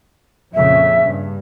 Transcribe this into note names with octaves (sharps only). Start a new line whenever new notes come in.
F2 A#2 C#3 E5
G2